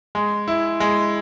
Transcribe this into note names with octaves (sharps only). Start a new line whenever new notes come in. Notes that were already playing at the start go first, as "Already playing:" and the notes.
G#3
E4
G#3